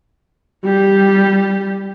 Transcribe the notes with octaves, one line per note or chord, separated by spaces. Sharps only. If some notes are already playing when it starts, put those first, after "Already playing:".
G3 G4